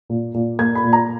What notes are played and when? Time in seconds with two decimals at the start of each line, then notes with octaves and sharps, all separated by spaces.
0.10 A#2
0.34 A#2
0.59 A#3 G#6
0.75 B5
0.84 A#2
0.93 A#5